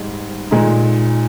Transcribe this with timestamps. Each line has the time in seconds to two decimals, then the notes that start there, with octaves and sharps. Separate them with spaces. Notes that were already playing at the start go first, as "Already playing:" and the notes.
Already playing: G#2 G3
0.51 A#2 G#3 D#4